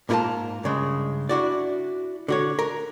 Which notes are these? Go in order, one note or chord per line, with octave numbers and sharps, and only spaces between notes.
G#2 A#3 E4 F4 A#4 A5
G2 C#3 G#3
D4 E4 F#4 D5
D3 F#4 C#5
A#4